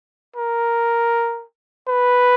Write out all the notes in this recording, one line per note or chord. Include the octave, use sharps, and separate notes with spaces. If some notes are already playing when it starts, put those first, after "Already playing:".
A#4
B4